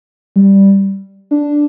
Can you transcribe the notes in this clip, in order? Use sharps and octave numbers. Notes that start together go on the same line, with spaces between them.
G3
D4